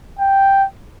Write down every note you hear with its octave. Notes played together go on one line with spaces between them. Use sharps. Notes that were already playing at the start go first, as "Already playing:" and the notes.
G5